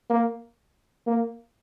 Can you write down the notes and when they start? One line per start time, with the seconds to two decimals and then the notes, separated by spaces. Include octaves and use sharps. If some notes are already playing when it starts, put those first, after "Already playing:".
0.10 A#3
1.07 A#3